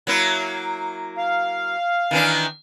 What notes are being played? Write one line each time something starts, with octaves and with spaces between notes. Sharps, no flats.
F#3 A#3 E4
F5
D#3 E3 D4